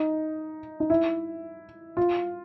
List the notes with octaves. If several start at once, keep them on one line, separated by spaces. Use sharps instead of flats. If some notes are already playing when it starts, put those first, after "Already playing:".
Already playing: D#4
D#4
E4
F4